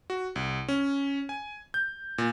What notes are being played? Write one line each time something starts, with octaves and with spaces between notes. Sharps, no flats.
F#4
C2
C#4
G#5
G6
A#2